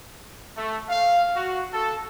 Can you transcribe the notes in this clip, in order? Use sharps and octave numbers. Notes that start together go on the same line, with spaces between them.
A3
F5
F#4
A4